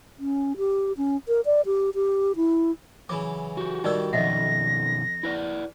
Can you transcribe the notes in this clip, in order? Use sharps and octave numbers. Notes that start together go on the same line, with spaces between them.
C#4
G4
C#4
A#4
D5
G4
G4
E4
C#3 E3 F#3 D6
F#4 G4
D#3 G3 D#4 A4 D5 E6
F2 B2 D#3 D#5 E5 F#5 A#6
E4 B4 D5